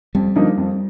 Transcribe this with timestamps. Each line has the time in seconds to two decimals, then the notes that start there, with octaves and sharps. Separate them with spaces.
0.15 F2 G3
0.36 D3 F3 A#3 D#4
0.57 F2